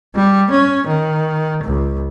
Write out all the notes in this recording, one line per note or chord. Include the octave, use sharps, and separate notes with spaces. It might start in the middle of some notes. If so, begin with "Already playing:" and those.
G3
C#4
D#3
C#2